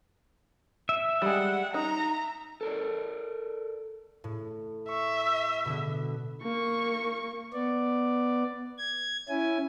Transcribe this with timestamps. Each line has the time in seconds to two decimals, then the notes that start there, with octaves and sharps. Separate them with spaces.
0.89 E5
1.22 G3 G#3 F#5
1.74 D#4 A#5
2.61 A4 A#4 D5
4.24 A2
4.88 E5 C#6
5.65 B2 D3 B3
6.43 A#3 C#6
7.53 B3 D5
8.78 G#6
9.29 C#4 E4 G#5